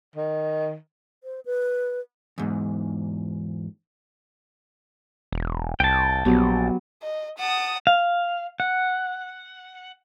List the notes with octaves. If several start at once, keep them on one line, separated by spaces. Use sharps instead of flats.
D#3
C5
B4
E2 G#2
E1
C2 G5 A5
A#1 F#3 B3 G4
D#5
F#5 A5 D#6
F5
F#5